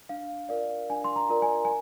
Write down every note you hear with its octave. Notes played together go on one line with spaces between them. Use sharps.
D4 F5
F4 A#4 D5 F5
D4 G#5
C6
A#5
F4 A#4 D5
G#5
G#5